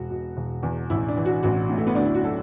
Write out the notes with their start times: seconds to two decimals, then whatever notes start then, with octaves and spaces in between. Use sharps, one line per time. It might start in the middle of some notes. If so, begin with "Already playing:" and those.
Already playing: E1 F#4
0.10 B2
0.37 E1
0.63 E2
0.90 A1 E4
1.08 D4
1.17 E3
1.25 F#4
1.43 A1 F#4
1.70 A2
1.78 A3
1.87 B3
1.95 D2 D4
2.05 E4
2.14 F#4
2.23 F#3 A4